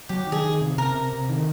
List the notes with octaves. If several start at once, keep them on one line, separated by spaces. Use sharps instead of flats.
F#3 G4
D#3
G#4
D#3
C3
C3 A#4
C3
C3
D#3